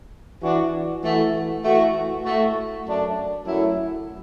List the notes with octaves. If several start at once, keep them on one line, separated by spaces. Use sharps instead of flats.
E3 D4 F#4
E3 A3 F#4
E3 A3 F#4
A2 A3 F#4
F#2 F#3 A3 D4
F#2 F#3 A3 E4